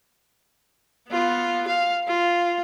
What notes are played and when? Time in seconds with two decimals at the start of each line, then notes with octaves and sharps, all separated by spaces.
1.08 B3 F4
1.67 F5
2.07 F4